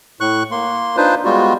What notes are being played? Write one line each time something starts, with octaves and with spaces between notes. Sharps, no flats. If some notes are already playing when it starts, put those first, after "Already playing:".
A2 C#6 F#6
A#3 C6
D4 D#4 F4 B4 C5
G3 G#3 B3 F4 F#4